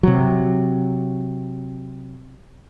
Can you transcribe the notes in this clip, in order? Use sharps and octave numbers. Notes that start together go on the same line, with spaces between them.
C3 F#3